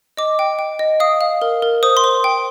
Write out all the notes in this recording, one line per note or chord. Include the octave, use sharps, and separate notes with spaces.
D#5 D6
G5
G5
D#5
F5 D#6
F5
A#4
A#4
C5 D#6
C6
C5
G5